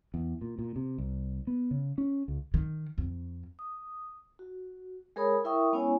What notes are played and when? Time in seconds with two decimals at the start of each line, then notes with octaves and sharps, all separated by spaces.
0.14 E2
0.41 A#2
0.59 A#2
0.76 C3
0.98 C2
1.47 B3
1.71 C#3
1.98 C#4
2.28 C#2
2.54 D#3
2.98 F2
3.59 D#6
4.39 F#4
5.16 G#3 G#4 A#4 C#5 B5 D#6
5.44 E4 A#4 E5 G5 C#6 D#6
5.72 G#3 B3 C#4 E4 C#5 G#5